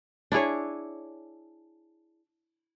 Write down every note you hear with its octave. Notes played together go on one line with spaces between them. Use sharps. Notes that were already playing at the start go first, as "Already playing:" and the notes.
D4 E4 G#4 C#5